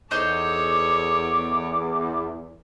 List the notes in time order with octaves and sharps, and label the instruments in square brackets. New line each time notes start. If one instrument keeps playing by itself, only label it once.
[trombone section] E2 [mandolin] D#4 C5 G6 [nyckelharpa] A4 C#5 [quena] D6